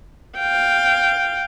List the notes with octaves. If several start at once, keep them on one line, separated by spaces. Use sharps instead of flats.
F5 G5